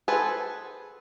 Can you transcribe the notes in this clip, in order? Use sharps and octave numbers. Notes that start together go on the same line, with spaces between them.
G#4 A4 B4 C5